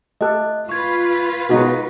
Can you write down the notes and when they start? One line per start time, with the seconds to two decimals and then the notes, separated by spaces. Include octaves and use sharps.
0.21 A3 G4 A4 D#5 F#6
0.69 F4 B4 C#6 G#6
1.50 B2 G#3 D#4 F#4